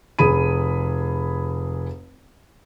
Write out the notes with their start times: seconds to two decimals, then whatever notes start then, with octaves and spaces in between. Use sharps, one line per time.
0.19 F1 G#4 B5 D#7